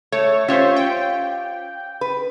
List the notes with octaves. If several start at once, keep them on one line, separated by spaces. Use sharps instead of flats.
A3 C#5
C#4 F4 G4 C5 C#5 E5
G5
B4